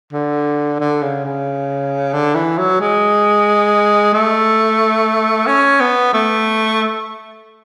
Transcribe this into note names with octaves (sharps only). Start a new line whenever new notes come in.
D3
D3
C#3
C#3
D3
E3
F#3
G#3
A3
C#4
B3
A3